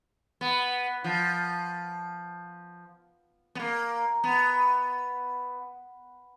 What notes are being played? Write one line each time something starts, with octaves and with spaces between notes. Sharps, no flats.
B3
F3
B3
A#3
B3